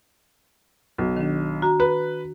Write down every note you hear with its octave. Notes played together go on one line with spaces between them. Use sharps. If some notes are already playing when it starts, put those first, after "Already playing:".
B1
D#3 D4
F#4 A#5
B4